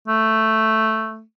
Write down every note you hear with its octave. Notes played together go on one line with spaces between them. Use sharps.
A3